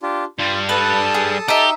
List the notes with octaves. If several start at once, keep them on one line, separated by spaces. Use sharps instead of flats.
D4 F4 G4
G2 G3 F4
A4 B4 A5 D#6
G#4
D#4 G4 E5